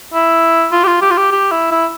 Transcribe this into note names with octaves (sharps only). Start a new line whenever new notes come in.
E4
F4
G4
F4
G4
F4
G4
G4
E4
E4